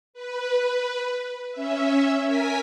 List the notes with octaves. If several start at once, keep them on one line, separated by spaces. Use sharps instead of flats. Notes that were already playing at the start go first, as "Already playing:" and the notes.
B4
C#4 E5
A#4 G#5 B6